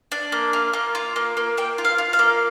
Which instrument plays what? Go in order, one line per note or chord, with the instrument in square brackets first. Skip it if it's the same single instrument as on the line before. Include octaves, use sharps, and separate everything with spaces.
[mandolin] D4
A#3
F4
A#3
F4
A#3
A#3
A#3 G5
F4
F5
F4
F5
A#3